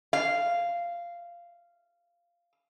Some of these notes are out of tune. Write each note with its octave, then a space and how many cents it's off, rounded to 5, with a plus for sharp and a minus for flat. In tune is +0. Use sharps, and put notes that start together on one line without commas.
F5 -10